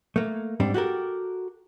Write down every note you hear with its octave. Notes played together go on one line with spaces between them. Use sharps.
A3 A#3
G#2 G3 C4 D4
F#4 G4 A4 A#4